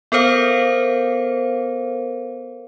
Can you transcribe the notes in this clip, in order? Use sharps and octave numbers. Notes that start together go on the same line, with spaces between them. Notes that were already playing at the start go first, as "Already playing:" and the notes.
B3 A4 A#4 C5 F5